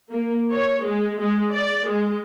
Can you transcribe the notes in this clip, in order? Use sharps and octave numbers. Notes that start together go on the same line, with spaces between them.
A#3
C#5
G#3
G#3
D5
G#3